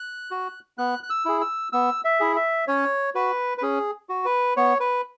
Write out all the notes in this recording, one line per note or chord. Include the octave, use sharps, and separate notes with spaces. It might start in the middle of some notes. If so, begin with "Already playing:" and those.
Already playing: F#6
F#4
B3 F#6
F#6
E6
E4 G#4
E6
B3 E6
E5
E4 G#4
E5
C#4 C#5
F#4 B4
B4
C#4 G#4
F#4
B4
B3 C#5
B4